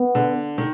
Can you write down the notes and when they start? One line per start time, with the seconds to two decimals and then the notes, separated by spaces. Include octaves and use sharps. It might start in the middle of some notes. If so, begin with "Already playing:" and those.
Already playing: B3
0.15 D3
0.58 D#3